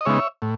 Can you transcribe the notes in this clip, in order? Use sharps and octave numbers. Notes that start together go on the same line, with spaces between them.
D#5
C#3 G#3 B3 D#4 C#5 E5
A2